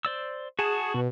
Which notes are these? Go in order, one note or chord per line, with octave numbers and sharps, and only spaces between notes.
C5 D5 E6
F#4 G#4 A5
B2